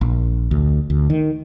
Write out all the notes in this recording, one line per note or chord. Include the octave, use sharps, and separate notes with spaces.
A#1
D2
D2
D#3